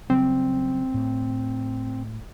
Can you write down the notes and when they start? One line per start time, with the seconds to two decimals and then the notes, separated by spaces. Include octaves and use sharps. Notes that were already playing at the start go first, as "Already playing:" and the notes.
0.10 C#3 F#3 G3 C4
0.94 A2